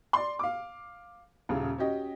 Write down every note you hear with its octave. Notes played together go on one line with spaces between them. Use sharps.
D5 C6
F5 D6
D#1 C#3
C#4 F#4 G4 D#5